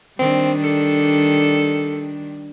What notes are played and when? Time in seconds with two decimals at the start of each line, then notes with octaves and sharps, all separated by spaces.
0.19 D#3 G3 C4 D4
0.64 A4